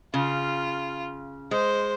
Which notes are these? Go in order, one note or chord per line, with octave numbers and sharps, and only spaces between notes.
C#3 F4
G#3 C5